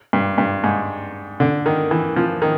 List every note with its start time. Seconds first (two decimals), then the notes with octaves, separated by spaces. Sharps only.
0.13 G2
0.38 G2
0.64 G#2
1.40 D3
1.66 D#3
1.91 E3
2.16 F3
2.42 D#3